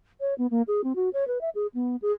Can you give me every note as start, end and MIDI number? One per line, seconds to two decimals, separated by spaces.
0.21 0.34 73
0.38 0.47 59
0.51 0.62 58
0.68 0.81 68
0.84 0.93 60
0.95 1.09 66
1.13 1.27 73
1.27 1.41 71
1.41 1.50 76
1.55 1.67 68
1.74 1.96 59
2.02 2.12 68